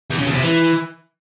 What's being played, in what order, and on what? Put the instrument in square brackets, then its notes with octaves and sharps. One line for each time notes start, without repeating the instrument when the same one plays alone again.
[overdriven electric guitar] E2
C#3
E2
C3
E3